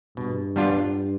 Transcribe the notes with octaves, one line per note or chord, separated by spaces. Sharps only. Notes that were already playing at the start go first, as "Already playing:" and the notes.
G2 B2
G3 B3 D4 F4